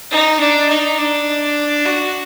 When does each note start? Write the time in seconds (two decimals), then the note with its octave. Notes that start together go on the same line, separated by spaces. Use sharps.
0.11 D#4
0.40 D4
0.69 D#4
0.99 D4
1.85 F#4